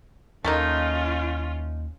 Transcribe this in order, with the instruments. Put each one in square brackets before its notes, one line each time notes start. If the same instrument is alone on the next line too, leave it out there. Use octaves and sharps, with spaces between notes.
[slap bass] D#2 [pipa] A3 A#3 D#4 [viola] C#4 F4